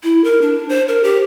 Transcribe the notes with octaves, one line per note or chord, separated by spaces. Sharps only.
E4
A#4
D4
C5
A#4
G4